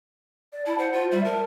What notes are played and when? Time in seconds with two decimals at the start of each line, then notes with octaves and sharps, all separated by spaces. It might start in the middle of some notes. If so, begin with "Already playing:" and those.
0.53 D5
0.66 E4 A5
0.79 C5 F#5
0.93 F4
1.11 G3 E5
1.25 A#4 A5